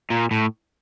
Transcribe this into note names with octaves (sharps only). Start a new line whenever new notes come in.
A#2
A2